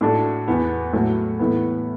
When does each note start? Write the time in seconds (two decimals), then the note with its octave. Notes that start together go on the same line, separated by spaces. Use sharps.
0.01 A2 A3 D4 F#4
0.48 E2 E3 B3
0.93 A2 F#3 A3
1.39 A2 E3 B3